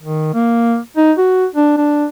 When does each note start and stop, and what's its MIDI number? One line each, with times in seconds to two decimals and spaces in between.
0.02 0.30 51
0.34 0.78 58
0.97 1.12 63
1.18 1.46 66
1.55 1.77 62
1.77 2.06 62